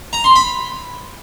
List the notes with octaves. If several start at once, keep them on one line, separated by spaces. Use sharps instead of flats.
A#5
C6
B5